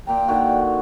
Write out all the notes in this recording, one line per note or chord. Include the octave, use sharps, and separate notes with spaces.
A#2 G5 A#5
D3 D#3 F#4